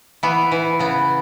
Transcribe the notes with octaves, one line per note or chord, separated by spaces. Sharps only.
E3 B3
E3
C#3 B3